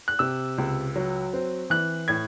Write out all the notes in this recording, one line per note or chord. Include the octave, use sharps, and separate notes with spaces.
F#6
C3 E6
C#2
F#3
C4
E3 F#6
A2 G#6